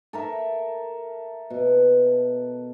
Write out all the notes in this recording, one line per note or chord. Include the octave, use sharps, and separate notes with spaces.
A4 A#4 E5
B2